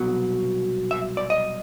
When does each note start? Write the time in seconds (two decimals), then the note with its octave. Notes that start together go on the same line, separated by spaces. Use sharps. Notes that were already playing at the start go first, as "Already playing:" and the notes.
Already playing: C2 B2 F#3
0.91 E5
1.17 D5
1.30 D#5